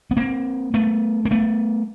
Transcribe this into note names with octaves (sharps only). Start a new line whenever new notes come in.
B3
A#3 C4
A3 B3
A#3
A3 B3